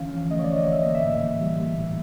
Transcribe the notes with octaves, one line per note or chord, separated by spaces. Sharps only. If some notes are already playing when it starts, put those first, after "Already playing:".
Already playing: D3 E3 C#4 F5
F3
A3 D#5
C#5
D5
C#4
D#5
D3
E5
A#3 D#5
E5
A2
E3
G3
A#3
A2